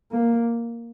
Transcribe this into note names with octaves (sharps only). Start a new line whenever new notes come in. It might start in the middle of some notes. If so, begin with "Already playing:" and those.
A#3